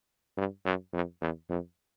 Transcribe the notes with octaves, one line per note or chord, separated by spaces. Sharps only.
G2
F#2
F2
E2
F2